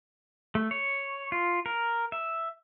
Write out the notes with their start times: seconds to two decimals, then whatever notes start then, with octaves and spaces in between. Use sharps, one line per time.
0.55 A3
0.71 C#5
1.32 F4
1.66 A#4
2.12 E5